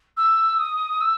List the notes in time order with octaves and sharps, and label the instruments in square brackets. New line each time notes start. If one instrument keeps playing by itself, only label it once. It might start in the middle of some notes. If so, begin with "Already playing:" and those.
[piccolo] E6
D#6
E6